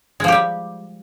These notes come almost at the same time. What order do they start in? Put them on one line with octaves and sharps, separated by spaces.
G#3 F3 G4 G3